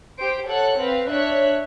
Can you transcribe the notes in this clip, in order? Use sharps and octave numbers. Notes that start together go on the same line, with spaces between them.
G4 C5 D7
A4 C#5 F#5 F#6
C4 B4 F5
D4 C#5 E5 F#6